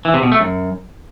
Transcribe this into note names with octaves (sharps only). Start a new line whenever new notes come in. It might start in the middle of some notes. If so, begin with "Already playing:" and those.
E3
C3
B2
A3
F#2